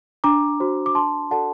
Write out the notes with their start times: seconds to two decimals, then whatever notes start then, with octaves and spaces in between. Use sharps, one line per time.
0.24 D4 A#5 D6
0.60 F#4 C5
0.86 D6
0.95 D4 A5 C6
1.30 F#4 A4 D5 F#5 A5